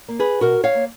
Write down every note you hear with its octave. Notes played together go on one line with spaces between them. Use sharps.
A#3
G#4 B4
B2 F#4 A#4
C#5 F5
A#3